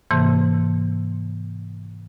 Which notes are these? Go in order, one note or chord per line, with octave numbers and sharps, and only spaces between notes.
G#2 C3 E3 A#3 A5 G6